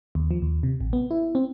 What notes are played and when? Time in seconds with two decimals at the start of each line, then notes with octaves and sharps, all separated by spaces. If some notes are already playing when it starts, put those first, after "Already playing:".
0.15 D#2
0.31 F3
0.42 D#2
0.63 C3
0.81 A1
0.93 B3
1.11 E4
1.35 C4